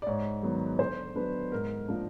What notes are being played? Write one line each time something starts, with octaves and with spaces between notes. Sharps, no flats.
D5
G#2 C#5
D#3 F#3 B3
D3 C5
F#3 B3 D4 B4
G#2 A#4
F3 A#3 D4